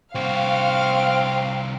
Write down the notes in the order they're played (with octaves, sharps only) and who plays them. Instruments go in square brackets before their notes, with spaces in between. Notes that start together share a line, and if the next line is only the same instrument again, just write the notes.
[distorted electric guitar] C2 F#4 [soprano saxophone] C4 [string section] F5